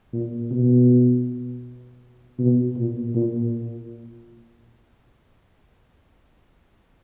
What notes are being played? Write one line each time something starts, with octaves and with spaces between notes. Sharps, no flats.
A#2
B2
B2
A#2
A#2